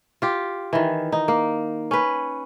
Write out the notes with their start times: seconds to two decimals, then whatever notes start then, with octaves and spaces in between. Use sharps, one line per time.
0.22 F4 G4
0.73 D#3 E3
1.12 D#4
1.28 A#3
1.91 C#4 B4